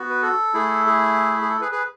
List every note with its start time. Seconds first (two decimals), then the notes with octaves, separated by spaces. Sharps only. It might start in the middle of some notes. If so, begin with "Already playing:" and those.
Already playing: B3 F#4
0.10 B4
0.22 A4
0.54 A3 E4 G#4
0.87 G#4
1.41 G#4
1.50 A4
1.61 G#4 B4
1.72 G#4 B4